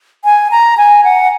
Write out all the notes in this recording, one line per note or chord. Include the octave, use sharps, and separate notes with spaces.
G#5
A#5
G#5
F#5